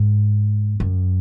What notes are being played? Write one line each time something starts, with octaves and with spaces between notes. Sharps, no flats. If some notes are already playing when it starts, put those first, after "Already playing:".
Already playing: G#2
F#2